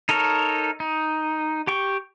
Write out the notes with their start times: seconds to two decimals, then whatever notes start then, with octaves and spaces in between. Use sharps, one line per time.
0.09 D#4 A4 A#4 C#5
0.80 D#4
1.67 G4 G5 C#6